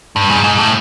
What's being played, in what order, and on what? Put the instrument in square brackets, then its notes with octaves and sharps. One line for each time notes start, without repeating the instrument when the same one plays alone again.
[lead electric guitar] G2
G#2
G#2
A2